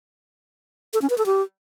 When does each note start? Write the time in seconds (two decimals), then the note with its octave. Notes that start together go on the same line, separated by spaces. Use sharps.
0.94 A4
1.02 C#4
1.10 B4
1.18 A4
1.26 G4